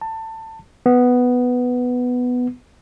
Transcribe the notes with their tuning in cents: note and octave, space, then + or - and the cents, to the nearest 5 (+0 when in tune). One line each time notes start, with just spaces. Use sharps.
A5 +20
B3 +5